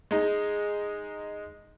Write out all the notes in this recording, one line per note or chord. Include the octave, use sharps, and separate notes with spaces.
G#3 D#4